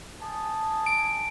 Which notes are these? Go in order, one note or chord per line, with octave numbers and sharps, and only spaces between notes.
G#5 A5 D#6
D7